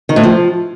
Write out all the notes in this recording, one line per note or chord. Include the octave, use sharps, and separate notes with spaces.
D#3
A2
F3